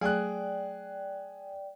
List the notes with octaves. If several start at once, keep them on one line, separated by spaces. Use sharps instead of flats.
F#3 A3 G#4 D5 G5 F#6